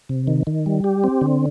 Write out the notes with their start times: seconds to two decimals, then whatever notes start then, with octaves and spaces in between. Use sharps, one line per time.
0.09 C3
0.27 D#3
0.47 D#3
0.66 G3
0.84 G4
1.04 C4
1.21 D3